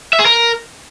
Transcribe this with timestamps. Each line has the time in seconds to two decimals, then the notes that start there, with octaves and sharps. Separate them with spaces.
0.13 E5
0.19 G#4
0.26 A#4